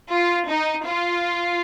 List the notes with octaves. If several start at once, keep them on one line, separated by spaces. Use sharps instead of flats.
F4
D#4
F4